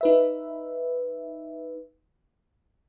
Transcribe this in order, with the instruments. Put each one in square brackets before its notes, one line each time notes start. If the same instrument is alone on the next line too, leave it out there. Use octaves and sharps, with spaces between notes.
[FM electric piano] D#4 B4 E5